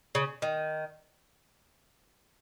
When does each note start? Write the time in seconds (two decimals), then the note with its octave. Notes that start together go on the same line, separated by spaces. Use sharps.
0.15 C#3
0.42 D#3